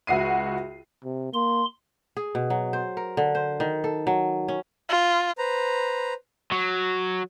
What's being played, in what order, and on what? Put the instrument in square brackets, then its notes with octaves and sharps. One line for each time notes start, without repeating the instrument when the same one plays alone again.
[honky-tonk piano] C#2 F#4 E5 C7 D#7
[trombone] C3
[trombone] A#3 [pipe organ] C6
[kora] G#4
B2
F#3
C5
A#4
D3
C5
D#3
A4
F#3
C#4
[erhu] F4
[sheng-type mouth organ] B4 C5 A#5
[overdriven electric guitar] F#3